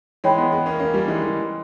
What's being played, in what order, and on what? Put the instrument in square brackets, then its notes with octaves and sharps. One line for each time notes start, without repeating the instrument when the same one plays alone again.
[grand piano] E3 G#3 [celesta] C#5 G5 B5
[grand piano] G#3 B3
G#3 B3
A#3 C#4
A#3 C#4
G3 A#3
E3 G#3
E3 G#3